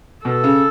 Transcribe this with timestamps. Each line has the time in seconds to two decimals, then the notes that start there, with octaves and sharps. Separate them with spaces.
0.25 B2 A4
0.44 C#3